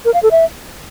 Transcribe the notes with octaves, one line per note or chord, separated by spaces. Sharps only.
A#4
F5
A4
E5